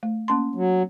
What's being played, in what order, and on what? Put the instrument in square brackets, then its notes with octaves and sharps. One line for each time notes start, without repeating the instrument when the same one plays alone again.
[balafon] A3
A#3 C#4 C6
[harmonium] F#3